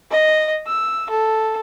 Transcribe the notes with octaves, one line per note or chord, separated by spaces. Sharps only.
D#5
E6
A4